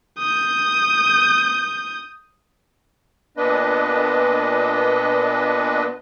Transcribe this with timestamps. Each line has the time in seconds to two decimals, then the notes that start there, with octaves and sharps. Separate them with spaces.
0.18 D#6 G6
3.37 A#2 B3 D4 B4 D#5